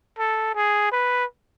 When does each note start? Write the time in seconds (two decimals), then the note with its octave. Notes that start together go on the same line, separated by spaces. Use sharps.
0.19 A4
0.55 G#4
0.92 B4